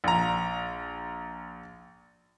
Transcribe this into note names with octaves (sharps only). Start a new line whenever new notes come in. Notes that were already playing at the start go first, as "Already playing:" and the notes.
A#1 A#5